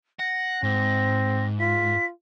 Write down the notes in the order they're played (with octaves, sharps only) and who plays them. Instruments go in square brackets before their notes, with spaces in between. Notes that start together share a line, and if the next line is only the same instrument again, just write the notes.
[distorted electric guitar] F#5 [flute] A#6
[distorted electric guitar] G#2 [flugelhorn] C4
[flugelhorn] F4 [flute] B6